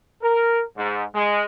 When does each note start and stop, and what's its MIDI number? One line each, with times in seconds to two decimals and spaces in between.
0.21 0.62 70
0.76 1.03 44
1.14 1.44 56